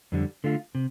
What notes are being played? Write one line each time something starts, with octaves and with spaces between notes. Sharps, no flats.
F2 D3 G3
D3 A3 F4
C3